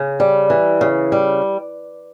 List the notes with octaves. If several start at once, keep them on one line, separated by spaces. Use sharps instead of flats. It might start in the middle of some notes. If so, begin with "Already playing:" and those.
Already playing: C#3
G3
E3
C#3
G3